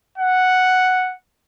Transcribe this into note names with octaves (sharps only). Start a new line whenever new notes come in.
F#5